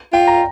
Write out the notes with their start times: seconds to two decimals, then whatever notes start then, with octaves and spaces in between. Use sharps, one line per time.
0.13 F4 G5
0.28 A#5